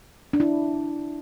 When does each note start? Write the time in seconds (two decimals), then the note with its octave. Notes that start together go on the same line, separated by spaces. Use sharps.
0.33 D4
0.40 E4